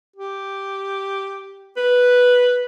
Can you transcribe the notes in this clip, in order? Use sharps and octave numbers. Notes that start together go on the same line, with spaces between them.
G4
B4